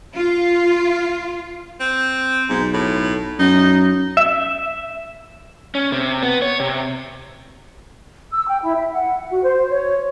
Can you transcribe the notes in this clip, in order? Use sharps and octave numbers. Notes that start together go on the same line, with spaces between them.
F4
C4
B1 G#2
A2
F#2 D#4
E5
C#4
C3
B3
C#5
C3
E6
G5
E4
E5
F#5
F#4
C5
C#5